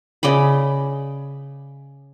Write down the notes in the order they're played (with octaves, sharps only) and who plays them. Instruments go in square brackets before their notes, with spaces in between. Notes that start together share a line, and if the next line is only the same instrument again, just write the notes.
[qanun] C#3 D5 D#5 B5